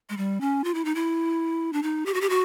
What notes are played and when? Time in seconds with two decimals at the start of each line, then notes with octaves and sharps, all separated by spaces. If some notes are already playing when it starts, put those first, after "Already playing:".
0.10 G#3
0.17 G3
0.41 C#4
0.64 F4
0.74 E4
0.85 D#4
0.95 E4
1.73 D4
1.83 D#4
2.06 G4
2.14 F#4
2.21 G4
2.30 F#4